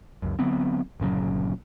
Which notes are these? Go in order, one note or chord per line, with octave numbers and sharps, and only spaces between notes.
C#2 F#2
D3 F#3 B3 C4
G1 A#2 C#3 F#3